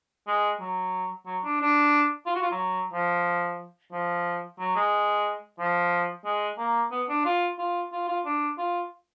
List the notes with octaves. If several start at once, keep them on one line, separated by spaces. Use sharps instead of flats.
G#3
F#3
F#3
D4
D4
F4
F#4
F4
F#3
F3
F3
F#3
G#3
F3
G#3
A#3
B3
D4
F4
F4
F4
F4
D4
F4